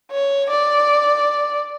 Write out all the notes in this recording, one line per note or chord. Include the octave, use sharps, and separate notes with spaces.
C#5
D5